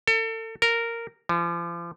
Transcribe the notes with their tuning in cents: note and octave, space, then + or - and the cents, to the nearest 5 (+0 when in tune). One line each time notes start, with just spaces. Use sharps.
A4 +35
A#4 -10
F3 -40